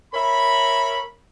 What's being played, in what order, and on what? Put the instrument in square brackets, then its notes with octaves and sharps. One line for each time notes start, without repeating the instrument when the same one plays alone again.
[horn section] A#4 C#5 E5 B5